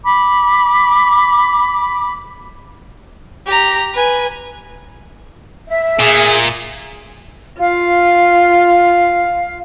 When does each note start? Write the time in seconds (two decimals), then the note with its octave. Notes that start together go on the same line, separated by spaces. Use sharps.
0.05 B5 D6
3.47 G4 A#5
3.94 B4 G#5
5.68 E5
5.99 A#2 G#4
7.60 F4 F5